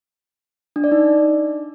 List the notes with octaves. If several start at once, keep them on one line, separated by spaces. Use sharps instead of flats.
D4
D5
D#4